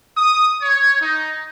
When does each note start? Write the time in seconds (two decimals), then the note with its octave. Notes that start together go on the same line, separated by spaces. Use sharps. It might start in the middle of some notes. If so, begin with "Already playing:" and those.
0.16 D#6
0.61 C#5
0.99 D#4